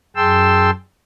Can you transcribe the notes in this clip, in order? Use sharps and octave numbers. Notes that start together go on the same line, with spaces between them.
F#2 G#4 G5 A5 C6 E6